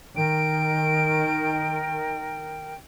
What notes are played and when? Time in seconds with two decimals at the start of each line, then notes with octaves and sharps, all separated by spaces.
0.16 D#3 A#4 G5 D7